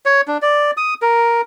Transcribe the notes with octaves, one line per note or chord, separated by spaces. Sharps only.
C#5
D4
D5
D#6
A#4